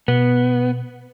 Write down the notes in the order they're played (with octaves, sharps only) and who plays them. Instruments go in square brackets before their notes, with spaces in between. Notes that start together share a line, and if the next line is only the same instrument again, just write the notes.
[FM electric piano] B2 [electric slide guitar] B3